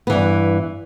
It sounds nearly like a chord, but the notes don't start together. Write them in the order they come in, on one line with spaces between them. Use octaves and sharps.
B3 E3 G2